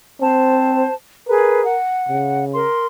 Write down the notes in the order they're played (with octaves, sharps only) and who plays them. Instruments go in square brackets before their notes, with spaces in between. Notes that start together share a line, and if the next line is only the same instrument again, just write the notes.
[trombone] C4 [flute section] C5 A5
[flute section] G#4 B4 [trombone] A#4
[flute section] F#5
[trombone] C#3
[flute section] A#4 C6